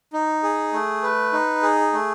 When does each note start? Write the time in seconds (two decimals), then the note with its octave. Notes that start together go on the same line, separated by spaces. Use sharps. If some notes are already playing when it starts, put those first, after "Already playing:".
0.13 D#4
0.43 G#4
0.73 A3
1.03 B4
1.33 D#4
1.63 G#4
1.93 A3